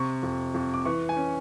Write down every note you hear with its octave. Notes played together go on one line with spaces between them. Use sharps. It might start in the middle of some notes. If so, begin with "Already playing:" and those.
Already playing: C3 C#6
F2
F2
D6
E3 C#6
G#5
C#4